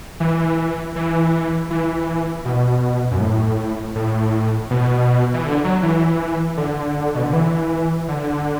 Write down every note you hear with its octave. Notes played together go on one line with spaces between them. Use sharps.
E3
E3
E3
B2
F#2
A2
A2
B2
E3
D3
F#3
E3
D3
B2
D3
E3
D3